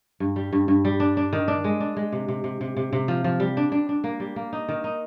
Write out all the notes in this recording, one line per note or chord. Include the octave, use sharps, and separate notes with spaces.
G2
G3
G2
G2
G3
D4
D4
D#3
D4
G#3
D4
G#3
C3
C3
C3
C3
C3
C3
F3
F3
G3
D4
D4
D4
A#3
G3
A#3
D#4
D#3
D#4